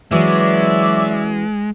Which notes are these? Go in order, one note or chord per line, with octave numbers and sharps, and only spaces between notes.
E3 F#3 G#3 C#4 F#4 D5 E5